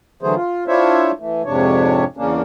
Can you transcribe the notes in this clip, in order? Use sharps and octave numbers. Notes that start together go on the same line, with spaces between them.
D3 E3 F#3 A3 G#4 C5
F4
D4 E4 F4 C5 C#5 E5
E3 A3
F2 G#2 C3 D4 C#5
E2 C#3 A#3 C#4 D4